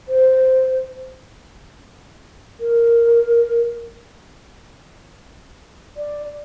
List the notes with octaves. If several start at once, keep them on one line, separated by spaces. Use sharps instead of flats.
C5
A#4
D5